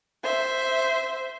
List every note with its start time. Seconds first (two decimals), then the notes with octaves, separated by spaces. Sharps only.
0.24 C5 E5